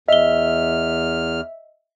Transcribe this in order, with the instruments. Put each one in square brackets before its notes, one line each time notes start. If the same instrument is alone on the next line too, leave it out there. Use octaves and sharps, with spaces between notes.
[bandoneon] E2 F6 [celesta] D#5 G7 [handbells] E5